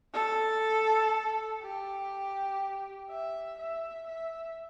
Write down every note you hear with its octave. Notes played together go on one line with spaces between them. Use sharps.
A4
G4
E5
E5
E5